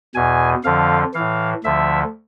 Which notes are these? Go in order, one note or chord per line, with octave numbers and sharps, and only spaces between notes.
E2 B2 G#5
F2 D3 F3 F5
A2 E3 F5
D2 D3 F3 E5